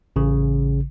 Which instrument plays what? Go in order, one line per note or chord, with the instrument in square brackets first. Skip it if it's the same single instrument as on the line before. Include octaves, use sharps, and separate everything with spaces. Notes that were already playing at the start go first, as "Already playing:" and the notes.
[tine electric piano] A1 C#3